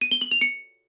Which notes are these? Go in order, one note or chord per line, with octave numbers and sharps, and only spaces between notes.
D#7
G7
F#7
F7
C#7